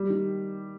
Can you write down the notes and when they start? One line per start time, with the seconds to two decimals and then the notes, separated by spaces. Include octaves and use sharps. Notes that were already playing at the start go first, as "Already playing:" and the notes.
Already playing: G3
0.10 D#3